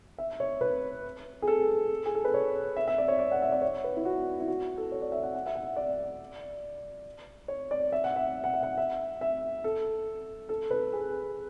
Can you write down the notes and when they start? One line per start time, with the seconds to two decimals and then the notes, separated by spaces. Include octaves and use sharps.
0.18 E5
0.40 C#5
0.61 B4
1.42 G#4
1.48 A4
2.06 G#4
2.15 A4
2.25 B4
2.34 C#5
2.77 E5
2.88 E5
2.98 D5
3.08 C#5
3.19 D5
3.32 F#5
3.42 E5
3.52 D5
3.62 C#5
3.84 B4
3.97 E4
4.05 F#4
4.40 E4
4.48 F#4
4.77 A4
4.92 C#5
5.02 D5
5.12 E5
5.23 F#5
5.34 F#5
5.46 E5
5.55 F#5
5.76 D5
7.48 C#5
7.71 D5
7.92 E5
8.04 F#5
8.16 E5
8.44 F#5
8.54 E5
8.63 F#5
8.78 E5
9.21 E5
9.64 A4
10.49 A4
10.71 B4
10.93 G#4